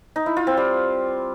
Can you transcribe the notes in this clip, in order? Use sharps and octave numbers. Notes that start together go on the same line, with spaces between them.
D#4
E4
F4
C4
G3